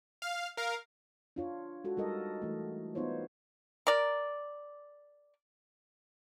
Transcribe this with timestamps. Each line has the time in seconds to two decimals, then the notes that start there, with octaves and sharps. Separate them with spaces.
0.22 F5
0.57 A#4 F5
1.36 D4 F4 C#5
1.84 G#3 F#4 A4
1.97 G3 G#3 D#4 A4 A#4 D#5
2.42 E3 A3
2.95 B3 D#4 F4 C5 C#5
3.87 A#4 D5